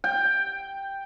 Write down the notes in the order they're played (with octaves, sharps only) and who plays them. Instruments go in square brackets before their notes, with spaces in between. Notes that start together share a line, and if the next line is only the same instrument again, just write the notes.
[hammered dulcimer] G5